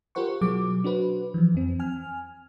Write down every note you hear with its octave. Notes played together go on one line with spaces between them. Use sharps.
F4 G4 A#4 C5 F#5 C#6
B2 F#3 G#4 D6
D4 F#4 B4 C5
E3 F3
F2 C4
G#5 F6